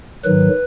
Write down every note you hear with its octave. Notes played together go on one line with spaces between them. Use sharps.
G#2 D#3 F#3 B4